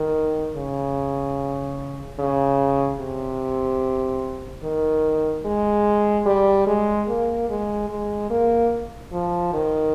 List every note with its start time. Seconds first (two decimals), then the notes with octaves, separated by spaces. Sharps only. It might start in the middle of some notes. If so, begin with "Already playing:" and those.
Already playing: D#3
0.56 C#3
2.19 C#3
3.00 C3
4.63 D#3
5.45 G#3
6.26 G3
6.67 G#3
7.09 A#3
7.49 G#3
7.89 G#3
8.30 A#3
9.12 F3
9.53 D#3